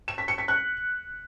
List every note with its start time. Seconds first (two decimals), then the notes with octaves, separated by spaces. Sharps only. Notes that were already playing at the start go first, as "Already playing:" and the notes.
0.08 E7
0.18 B6
0.28 C#7
0.38 B6
0.48 F#6